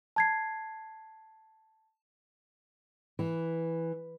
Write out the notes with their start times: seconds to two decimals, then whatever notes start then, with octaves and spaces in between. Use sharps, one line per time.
0.16 A5 G#6 C7
3.19 E3